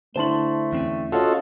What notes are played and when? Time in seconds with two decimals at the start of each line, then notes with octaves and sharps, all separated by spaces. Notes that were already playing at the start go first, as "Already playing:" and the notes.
0.16 D3 A3 E4 C5 A5 C6 F#7
0.73 E2 C4 C#4
1.13 C#4 F4 F#4 A4 C#5 D#5